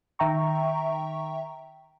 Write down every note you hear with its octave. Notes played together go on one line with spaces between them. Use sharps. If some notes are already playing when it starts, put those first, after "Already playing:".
D#3 E5 G5 A#5 C#6